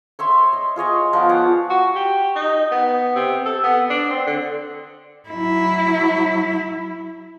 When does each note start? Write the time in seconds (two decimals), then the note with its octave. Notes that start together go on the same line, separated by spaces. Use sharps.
0.19 C#5 E5 C6
0.53 D#5
0.76 F4 G#4 C#5 D#5
1.13 F3 B3 D5
1.29 G#4 C#5 D5 F#5
1.70 F#4
1.96 G4
2.35 D#4
2.71 B3
3.15 C3
3.46 A4
3.63 B3
3.90 D4
4.10 C4
4.27 D3
5.29 F#3 E4